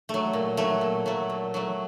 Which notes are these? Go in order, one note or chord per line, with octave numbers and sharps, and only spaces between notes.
F#3 A3
A#2
F#3 A3
A#2
F#3 A3
A#2
F#3 A3